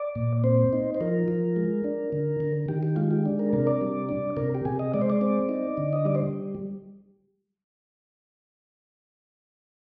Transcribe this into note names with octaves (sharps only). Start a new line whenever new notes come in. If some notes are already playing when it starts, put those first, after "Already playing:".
Already playing: D5
A#2
C4 C5
D#4
C5
F3 A#4
F3
G#3
D4
D3
D3
D#3 G4
G4
G#3 F4
G4
D4
A#4
C3 A#4
D5
G3
D4
C3 A#4
G4
C3 G#4
D#5
G#3 D5
C5
D5
C4
D#4
D3
D#5
G3 D5
C5